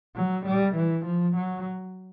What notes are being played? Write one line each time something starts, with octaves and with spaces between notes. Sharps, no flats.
F#3
G3
E3
F3
F#3